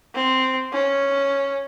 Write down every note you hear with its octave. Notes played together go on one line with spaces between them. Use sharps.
C4
C#4